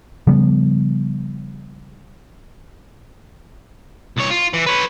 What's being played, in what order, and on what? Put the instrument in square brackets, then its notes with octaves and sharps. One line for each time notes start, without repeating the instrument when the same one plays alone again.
[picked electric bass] C#3 F3 G3 B3
[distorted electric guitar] C2 C#5
F4
E3
B4 C#5